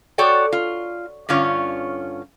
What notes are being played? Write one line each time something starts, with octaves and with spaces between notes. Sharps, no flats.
F#4 A4 C#5 D5 G5
F4
G2 D3 C#4 F4 C#5